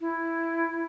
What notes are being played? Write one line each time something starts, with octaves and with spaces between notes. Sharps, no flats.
E4